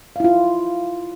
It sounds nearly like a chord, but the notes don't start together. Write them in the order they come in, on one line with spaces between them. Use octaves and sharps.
F5 E4 F4